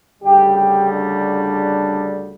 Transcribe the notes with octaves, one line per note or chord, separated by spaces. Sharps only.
D2 C#3 G3 G4
G4
D4